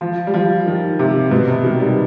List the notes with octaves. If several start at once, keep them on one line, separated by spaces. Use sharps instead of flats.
F3
G3
F3
D#3
C3
B2
C3
D#3
G3